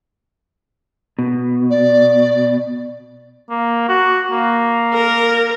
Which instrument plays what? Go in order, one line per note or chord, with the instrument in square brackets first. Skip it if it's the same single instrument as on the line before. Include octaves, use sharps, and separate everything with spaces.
[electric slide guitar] B2
[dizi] D5
[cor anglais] A#3
F#4
A#3
[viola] A#4